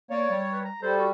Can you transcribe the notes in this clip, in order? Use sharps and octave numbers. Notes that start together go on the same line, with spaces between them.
A#3 C#5 D5
G3
B4
A#5
G3 A4 C5
F#4